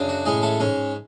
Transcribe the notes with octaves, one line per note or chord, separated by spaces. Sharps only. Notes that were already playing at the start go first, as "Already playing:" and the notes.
Already playing: F#2 C#3 D4
F#4
A2 G#3 C#4 G#4
A3 A4
G#2 G#3 C#4